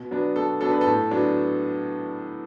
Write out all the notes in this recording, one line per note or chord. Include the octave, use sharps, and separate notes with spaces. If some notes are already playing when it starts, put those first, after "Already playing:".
Already playing: B2
F#3 B3 D4
B2 A4
F#3 B3 D4 A4
B4
A4
A2
F#3 B3 D4